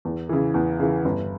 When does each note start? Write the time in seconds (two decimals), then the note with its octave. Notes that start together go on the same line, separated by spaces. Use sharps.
0.05 E2
0.29 C#3 E3
0.54 E2
0.80 C#3 E3
1.05 G1